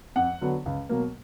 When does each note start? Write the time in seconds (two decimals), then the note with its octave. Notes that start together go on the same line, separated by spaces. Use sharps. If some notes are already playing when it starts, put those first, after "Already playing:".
0.16 F2 F#5
0.41 D3 F#3 B3
0.66 C#2
0.89 B2 F#3 A#3